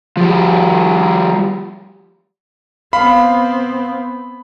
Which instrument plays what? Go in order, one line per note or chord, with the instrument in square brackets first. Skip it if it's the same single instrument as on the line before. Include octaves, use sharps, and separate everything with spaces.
[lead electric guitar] F3 G3
[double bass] B3 C4 [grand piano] F5 [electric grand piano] B5